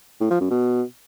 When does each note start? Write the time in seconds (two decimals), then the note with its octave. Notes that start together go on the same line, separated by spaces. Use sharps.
0.21 A2
0.31 F3
0.41 F#2
0.51 B2